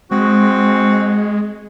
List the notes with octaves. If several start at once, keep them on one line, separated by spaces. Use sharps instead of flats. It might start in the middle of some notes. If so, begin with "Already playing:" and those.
G#3 C4 F#4